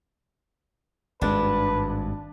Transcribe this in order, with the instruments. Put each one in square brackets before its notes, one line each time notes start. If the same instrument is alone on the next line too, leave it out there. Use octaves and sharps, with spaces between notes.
[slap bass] G#1 G2 G#3 [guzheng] D4 [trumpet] B4